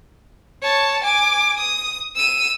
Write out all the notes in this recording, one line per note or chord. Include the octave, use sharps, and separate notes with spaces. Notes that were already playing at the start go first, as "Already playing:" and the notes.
C#5 A5
G#5 D6
D#6
E6 D#7